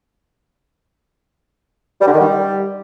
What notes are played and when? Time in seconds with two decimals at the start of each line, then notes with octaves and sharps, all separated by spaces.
2.01 G3
2.07 D3
2.13 D#3
2.20 G3